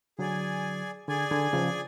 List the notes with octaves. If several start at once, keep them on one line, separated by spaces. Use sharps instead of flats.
D3 F#3 G#4 D5 G#5
D3 G#4 D5 G#5
D3
C#3 F3